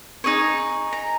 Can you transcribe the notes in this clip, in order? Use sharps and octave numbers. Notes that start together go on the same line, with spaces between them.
D#4 G#4 C#5 G#5
A#5